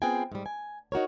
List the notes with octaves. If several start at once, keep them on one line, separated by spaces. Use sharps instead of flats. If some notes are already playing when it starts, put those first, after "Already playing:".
B3 C4 F4 G#4 G5 G#5
G#2 G3
G#5
D#4 F#4 A#4 C#5